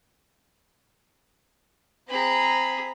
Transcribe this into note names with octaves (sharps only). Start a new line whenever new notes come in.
C4 G#4 A#5 B5